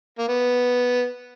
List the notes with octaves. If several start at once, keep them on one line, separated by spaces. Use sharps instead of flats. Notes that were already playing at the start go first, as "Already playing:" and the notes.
A#3
B3